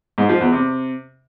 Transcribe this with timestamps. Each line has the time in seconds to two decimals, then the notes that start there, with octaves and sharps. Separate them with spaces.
0.18 G#2
0.29 F3
0.41 E2
0.52 C3